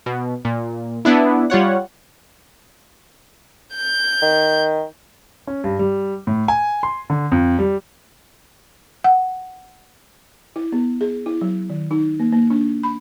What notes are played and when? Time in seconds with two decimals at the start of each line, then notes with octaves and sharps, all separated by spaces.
0.06 B2
0.45 A#2
1.05 B3 D4 E4
1.50 G3 F4 C#5 F#5
3.75 G6
4.22 D#3
5.47 C#4
5.64 G2
5.79 G3
6.27 A2
6.48 G#5
6.83 C6
7.10 D3
7.32 F2
7.59 G3
9.04 F#5
10.56 E4
10.72 B3
11.01 G#4
11.26 E4
11.41 F#3
11.70 D#3
11.91 D#4
12.20 A#3
12.32 A#3
12.50 D4
12.83 B5